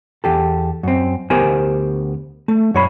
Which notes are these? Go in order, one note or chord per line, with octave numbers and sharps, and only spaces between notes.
E2 G4 A4
F#2 C4
D2 B3 G4 A#4 C5 G#5
A3
F#2 C#5 B5